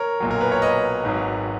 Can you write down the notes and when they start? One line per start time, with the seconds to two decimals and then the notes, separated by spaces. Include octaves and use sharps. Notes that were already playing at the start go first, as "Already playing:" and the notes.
Already playing: A#4 C#5
0.20 B1 A#2 F#3
0.31 A#4
0.41 B4
0.52 C#5
0.62 B4 D#5
1.04 G#1 G#2 F#3